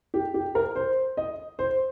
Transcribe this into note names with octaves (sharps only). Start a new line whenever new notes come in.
G4
G4
A#4
C5
D#5
C5